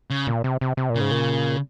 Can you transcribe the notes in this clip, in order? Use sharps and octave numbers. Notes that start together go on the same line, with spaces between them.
C#3
A#2
C3
C3
C3
A#2
C#3
G#2
A#2